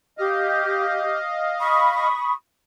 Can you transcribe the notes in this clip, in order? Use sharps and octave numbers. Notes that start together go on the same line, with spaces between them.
G4 D#5 F5
B5 C#6 D#6